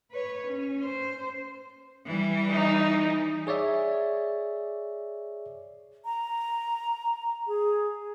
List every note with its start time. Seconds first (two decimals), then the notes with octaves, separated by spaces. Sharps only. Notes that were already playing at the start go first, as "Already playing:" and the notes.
0.11 B4 C#5
0.47 C#4
0.84 C5
2.06 E3 G3
2.51 D#4
3.47 G#4 C#5 D5 E5
6.05 A#5
7.47 G#4